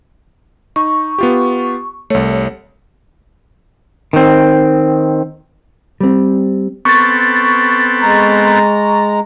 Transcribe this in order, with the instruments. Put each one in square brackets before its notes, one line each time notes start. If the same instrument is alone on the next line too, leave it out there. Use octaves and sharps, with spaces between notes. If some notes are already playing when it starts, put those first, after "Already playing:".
[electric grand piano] D#4 [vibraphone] C#6
[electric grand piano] B3 F4 G4
[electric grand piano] C2 A3 [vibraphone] C#5
[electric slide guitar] D#3 C4
[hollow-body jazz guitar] G3 C4
[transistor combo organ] B3 C4 A4 [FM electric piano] C#6 A6
[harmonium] G#3 A#5